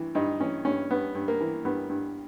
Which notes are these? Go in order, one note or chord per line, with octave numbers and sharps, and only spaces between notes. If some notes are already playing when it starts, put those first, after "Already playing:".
Already playing: G2 E3
G2 D#4
E3 C#4
G2 C#4
G2 B3
G2
A#3
E3
G2 B3
G2